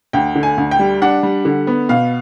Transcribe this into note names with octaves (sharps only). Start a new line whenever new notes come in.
D2 G5
D3
G#5
D2
G5
G3
D4 F#5
G3
D3
B3
B2 F5